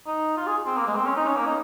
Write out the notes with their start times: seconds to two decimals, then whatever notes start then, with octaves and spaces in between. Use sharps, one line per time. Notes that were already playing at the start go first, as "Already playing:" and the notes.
0.07 D#4
0.37 F4
0.47 G#4
0.66 C4
0.77 A#3
0.87 G#3
0.96 C4
1.06 C#4
1.16 D#4
1.27 C#4
1.36 A#3
1.46 D#4